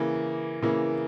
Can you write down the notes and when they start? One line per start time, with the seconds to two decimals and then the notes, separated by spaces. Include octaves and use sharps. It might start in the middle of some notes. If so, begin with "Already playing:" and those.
Already playing: C#3 E3 A#3
0.63 C#3 E3 A#3